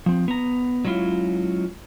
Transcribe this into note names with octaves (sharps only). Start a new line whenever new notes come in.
F3 C4
B3 A#5
F#3 G#3 C#4 E4 F4